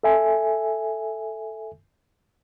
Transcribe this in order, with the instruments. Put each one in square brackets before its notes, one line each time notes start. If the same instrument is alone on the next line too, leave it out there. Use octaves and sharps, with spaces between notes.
[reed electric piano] A4 E5 G#5